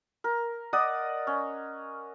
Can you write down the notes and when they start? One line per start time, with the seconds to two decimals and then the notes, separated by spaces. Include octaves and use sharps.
0.24 A#4
0.73 D5 D#5 F#5 D#6
1.27 C#4